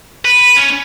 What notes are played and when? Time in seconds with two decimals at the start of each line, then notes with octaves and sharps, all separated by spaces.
0.25 B4
0.57 C#4